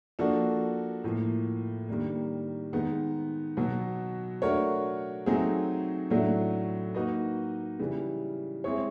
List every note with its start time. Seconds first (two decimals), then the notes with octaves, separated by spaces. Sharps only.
0.19 F3 A#3 D4 F#4 A4
1.04 A2 F3 A#3
1.89 D#3 G3 A#3 D4
2.73 D#3 G#3 B3 D#4
3.57 B2 F#3 B3
4.42 A3 D4 F#4 A#4 C#5
5.26 F#3 A3 C4 D#4 G#4
6.10 A2 F#3 A3 D4
6.94 A#3 D#4 F#4 B4 D#5
7.79 C#3 E3 G3
8.64 G#3 C4 E4 G#4 C#5